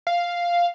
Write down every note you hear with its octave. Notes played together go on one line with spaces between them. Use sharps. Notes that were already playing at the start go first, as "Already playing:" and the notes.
F5